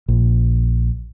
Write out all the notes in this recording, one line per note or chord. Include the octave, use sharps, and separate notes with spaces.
A#1